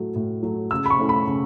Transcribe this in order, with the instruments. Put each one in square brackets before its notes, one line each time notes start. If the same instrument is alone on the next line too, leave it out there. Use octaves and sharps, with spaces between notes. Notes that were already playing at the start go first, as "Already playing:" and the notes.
Already playing: [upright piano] A2 F#3 A3
A2
F#3 A3
C#3 E6
B5
C#6
A3 C#4 E4
B5
C#3